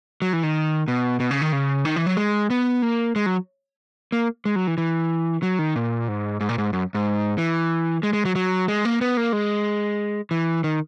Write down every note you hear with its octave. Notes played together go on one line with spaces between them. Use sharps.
F#3
E3
D#3
B2
B2
C#3
D#3
C#3
D#3
E3
F#3
G#3
B3
A#3
G#3
F#3
A#3
G#3
F#3
E3
E3
F#3
D#3
A#2
G#2
G#2
A#2
G#2
F#2
G#2
E3
G#3
G#3
F#3
F#3
G#3
A#3
B3
A#3
G#3
E3
D#3